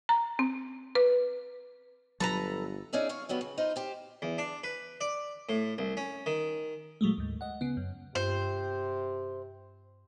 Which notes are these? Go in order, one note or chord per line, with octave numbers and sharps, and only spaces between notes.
A#5
C4
B4
G1 F#3 A4 B4 A#5
C#4 D#4 G#4 D5 E5
C#5 F5
D#3 F#3 G3 B3
C#3
D#4 F4 B4 C5
G4 C5
E2
D4
B4
D5
A2
C2
C#4
D#3
A#2 F#3 G#3 A3
D2 G#2
D#5 F#5
C#3 B3
F#2
G2 C3 C5